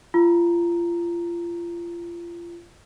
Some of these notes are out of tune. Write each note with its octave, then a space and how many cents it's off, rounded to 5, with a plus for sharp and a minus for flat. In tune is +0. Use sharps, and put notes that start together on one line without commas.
F4 -30 A#5 +0